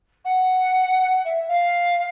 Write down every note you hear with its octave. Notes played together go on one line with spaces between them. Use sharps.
F#5
E5
F5